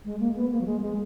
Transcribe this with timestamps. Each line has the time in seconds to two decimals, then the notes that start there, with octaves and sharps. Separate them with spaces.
0.05 G#3
0.20 A#3
0.35 B3
0.51 A#3
0.61 F#3
0.66 G#3
0.82 G#3